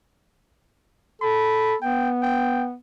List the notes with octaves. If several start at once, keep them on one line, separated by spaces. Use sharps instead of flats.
A4 B5
B3 G5
G5